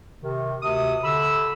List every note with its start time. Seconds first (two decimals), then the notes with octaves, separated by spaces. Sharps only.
0.22 C3 D#3
0.63 D2 C3 D#6
1.04 D3 B5 E6